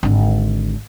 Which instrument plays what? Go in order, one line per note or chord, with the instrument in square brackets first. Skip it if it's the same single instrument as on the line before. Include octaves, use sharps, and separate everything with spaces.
[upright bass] G#1 D3